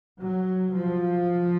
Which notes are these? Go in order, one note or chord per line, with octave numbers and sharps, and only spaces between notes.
F#3
F3